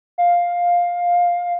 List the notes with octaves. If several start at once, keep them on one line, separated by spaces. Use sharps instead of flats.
F5